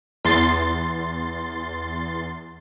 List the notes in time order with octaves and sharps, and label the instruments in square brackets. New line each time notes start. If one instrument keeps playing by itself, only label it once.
[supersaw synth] E2 C6 A6